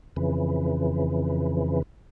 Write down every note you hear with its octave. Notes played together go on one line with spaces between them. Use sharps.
F2 C#3 E3